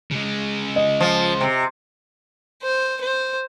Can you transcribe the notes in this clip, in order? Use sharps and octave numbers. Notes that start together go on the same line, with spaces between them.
C#3 G#3
D#5
F3
C3
C5
C5